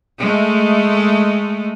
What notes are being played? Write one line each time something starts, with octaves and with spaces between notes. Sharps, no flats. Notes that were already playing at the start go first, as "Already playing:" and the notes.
G#3 A3